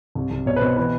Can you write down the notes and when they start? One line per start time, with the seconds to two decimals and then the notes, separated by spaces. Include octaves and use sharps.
0.15 C2
0.31 C2
0.46 B2 C#5
0.56 B4
0.62 B2 C5
0.77 E3 B4